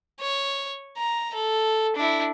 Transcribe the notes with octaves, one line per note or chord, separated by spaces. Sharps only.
C#5
A#5
A4
D4 E4